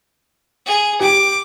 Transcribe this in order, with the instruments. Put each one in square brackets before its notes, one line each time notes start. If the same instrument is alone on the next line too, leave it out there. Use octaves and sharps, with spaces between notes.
[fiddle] G#4
[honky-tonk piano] G4 [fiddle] D6